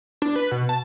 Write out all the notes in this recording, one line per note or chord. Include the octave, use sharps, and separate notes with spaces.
D4
B4
B2
A5